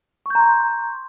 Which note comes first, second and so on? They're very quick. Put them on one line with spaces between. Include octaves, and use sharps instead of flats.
C#6 G6 A#5 C6